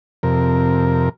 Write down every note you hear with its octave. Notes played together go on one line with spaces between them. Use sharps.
F2 C3 A#4